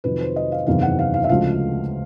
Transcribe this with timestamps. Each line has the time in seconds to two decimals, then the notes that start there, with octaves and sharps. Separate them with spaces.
0.04 F2 C3 D#3 F#3 B4
0.20 C5
0.36 D#5
0.52 F5
0.67 F#1 E2 C3 D#3 F5
0.82 F#5
0.99 F5
1.14 F5
1.24 E5
1.29 D2 C#3 F3 G#3 F5